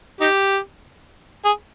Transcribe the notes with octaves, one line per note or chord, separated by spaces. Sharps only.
D#4 G4
G#4